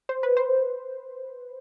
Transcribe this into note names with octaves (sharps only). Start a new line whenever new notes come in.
C5
B4
C5